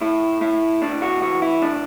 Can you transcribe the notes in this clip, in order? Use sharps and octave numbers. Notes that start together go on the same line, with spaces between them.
A2 E4
A2 E4
A2 D4
F#4
E3 F#4
E4
A2 D4